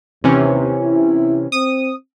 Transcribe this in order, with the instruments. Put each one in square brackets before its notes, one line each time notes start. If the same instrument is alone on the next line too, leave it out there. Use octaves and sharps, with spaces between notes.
[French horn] D#2 [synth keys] C3 E3 C#4
[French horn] E4
[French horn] C4 [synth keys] D#6